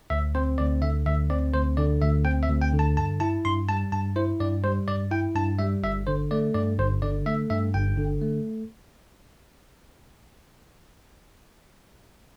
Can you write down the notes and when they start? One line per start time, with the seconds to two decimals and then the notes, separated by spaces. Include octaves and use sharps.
0.10 D2 E5
0.35 C4 C5
0.58 D2 D5
0.82 D3 E5
1.06 D2 E5
1.30 C4 D5
1.54 D2 C5
1.77 D3 D5
2.01 D2 E5
2.25 C4 G5
2.43 E5
2.50 D2
2.61 G5
2.73 D3
2.79 A5
2.97 G2 A5
3.20 E4 A5
3.45 G2 C6
3.69 G3 A5
3.92 G2 A5
4.16 E4 C5
4.40 G2 D5
4.64 G3 C5
4.88 G2 D5
5.11 E4 G5
5.36 G2 A5
5.59 G3 E5
5.83 G1 E5
6.07 D3 C5
6.31 A3 D5
6.54 G2 D5
6.78 G1 C5
7.02 D3 D5
7.26 A3 E5
7.50 G2 E5
7.74 G1 G5
7.97 D3
8.21 A3